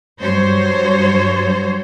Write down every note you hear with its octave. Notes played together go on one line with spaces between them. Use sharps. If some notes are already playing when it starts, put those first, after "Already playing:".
G2 F#3 C5 C#5